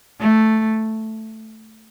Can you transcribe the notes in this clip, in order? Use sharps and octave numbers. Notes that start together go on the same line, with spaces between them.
A3